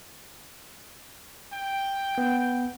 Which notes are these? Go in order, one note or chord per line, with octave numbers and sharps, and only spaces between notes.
G5
B3 G6